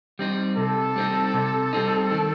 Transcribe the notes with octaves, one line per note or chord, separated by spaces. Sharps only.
G3 C4 D#4
C3 A4
G3 C4 D#4
C3
G3 C4 D#4
D#3